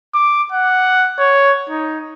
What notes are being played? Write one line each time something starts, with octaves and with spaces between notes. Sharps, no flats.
D6
F#5
C#5
D#4